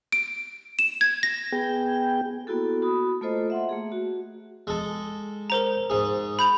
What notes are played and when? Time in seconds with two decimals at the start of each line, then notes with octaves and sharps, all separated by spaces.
0.12 D7
0.79 E7
1.01 G#6
1.23 A#6
1.52 B3 G#4 G5
2.47 A#3 B3 E4 F#4 A4
2.82 F#4 B5 D#6
3.21 A3 A#3 F4 A4 C5 D#5
3.50 E5 F#5 C6
3.69 A3 A#3 G#4
3.92 F#4
4.67 G#3 A4
5.50 A#4 C5 A#5
5.90 G#2 G#4
6.39 B5 G6 F7